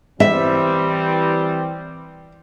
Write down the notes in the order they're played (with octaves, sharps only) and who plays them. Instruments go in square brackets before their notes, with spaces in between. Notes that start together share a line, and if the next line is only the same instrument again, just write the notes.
[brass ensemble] E3 G3 C4 [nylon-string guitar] E5